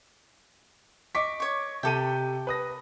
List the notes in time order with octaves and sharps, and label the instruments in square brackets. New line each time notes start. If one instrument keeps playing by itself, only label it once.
[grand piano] D#5 D6 B6 [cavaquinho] C#6
[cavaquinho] C#5 C#6
[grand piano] C3 G4 D#7 [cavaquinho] A4 G5
[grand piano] B4 D#6 A#6